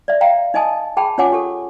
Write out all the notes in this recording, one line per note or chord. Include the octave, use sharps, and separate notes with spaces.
D5 E5
E5 F5 G5 A#5
D#4 D#5 G#5 A5 D#6
G#4 G5 A5 B5
C#4 F4 C#5 F#5 G#5 D6
G4 A4